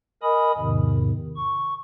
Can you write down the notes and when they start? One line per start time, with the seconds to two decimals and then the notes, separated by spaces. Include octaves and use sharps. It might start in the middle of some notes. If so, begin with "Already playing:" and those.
0.23 A#4 D#5 G#5 B5 D#6
0.58 E2 G#2 C3 D#3
1.36 C#6